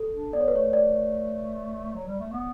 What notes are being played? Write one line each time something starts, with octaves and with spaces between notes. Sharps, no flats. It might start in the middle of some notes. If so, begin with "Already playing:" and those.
Already playing: A4
D4
B3 D5
C#5
B4
A3 C#5
D5
F#3
G3
A3
B3